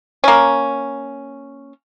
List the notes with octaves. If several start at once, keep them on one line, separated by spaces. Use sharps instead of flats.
A#3 C#4